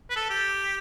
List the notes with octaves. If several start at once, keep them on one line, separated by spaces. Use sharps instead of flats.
B4
A4
G4